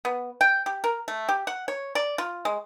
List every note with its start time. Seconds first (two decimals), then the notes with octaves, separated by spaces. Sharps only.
0.05 B3
0.41 G5
0.66 G4
0.84 A#4
1.08 A3
1.29 G4
1.47 F#5
1.68 C#5
1.95 D5
2.18 F4
2.45 G#3